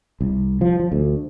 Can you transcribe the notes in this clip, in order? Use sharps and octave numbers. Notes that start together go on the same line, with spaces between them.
C2
F3
F3
D2